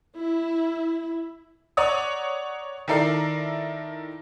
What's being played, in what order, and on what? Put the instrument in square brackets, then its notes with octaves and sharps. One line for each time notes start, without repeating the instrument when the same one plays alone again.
[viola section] E4
[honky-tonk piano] C#5 D5 F#5 A#5 D#6
D#3 E4 A4 A#4 D5 C7